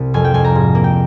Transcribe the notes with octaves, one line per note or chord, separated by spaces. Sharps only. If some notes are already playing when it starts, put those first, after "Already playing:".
Already playing: C2
F2 G#5
G5
F2 G#5
A#5
G#2
A#3
G5